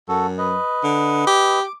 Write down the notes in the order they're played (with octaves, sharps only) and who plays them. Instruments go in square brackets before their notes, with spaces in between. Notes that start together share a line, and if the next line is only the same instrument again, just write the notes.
[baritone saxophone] F#2 [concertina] F#4 A4
[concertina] B4 D#5
[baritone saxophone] D3
G4
[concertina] D6